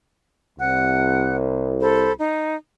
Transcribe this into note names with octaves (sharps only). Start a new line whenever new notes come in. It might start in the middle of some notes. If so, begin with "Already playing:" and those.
C2 F#5 F#6
A4 C5 B5
D#4